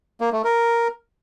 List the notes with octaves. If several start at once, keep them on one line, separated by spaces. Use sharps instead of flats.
A#3
A3
A#4